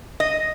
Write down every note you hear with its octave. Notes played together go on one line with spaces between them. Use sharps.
D#5